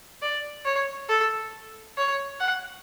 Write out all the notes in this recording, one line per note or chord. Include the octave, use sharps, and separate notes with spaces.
D5
C#5
A4
C#5
F#5